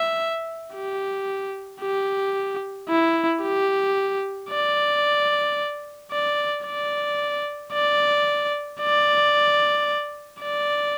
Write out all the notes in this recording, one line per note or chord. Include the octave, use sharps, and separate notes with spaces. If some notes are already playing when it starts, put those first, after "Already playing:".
Already playing: E5
G4
G4
E4
G4
D5
D5
D5
D5
D5
D5